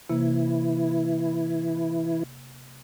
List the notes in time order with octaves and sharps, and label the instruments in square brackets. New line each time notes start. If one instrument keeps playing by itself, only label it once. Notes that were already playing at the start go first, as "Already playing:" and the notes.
[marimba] C3 A#3 [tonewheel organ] E3 E4